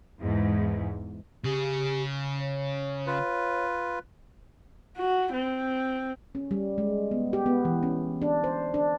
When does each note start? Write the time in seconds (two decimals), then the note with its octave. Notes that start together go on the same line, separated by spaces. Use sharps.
0.19 E2 G#2
1.44 C#3 G4 G#4
2.39 C#5
3.07 F4 B4
4.97 F#4
5.33 C4
6.35 C#4
6.51 G3
6.78 G#3
7.11 B3
7.33 G4
7.46 B3
7.65 E3
7.83 C#4
8.22 D4
8.44 C5
8.74 D4